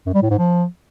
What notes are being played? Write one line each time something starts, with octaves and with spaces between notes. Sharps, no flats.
F#2
G3
A2
G#2
F3